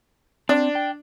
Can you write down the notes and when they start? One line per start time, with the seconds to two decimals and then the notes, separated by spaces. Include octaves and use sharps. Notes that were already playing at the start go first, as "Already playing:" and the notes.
0.49 C4 D4
0.75 G5